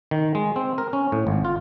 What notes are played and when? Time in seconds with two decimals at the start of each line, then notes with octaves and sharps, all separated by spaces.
0.11 D#3
0.35 G#3
0.56 C4
0.78 A#4
0.93 C#4
1.12 A2
1.27 G#1
1.45 F4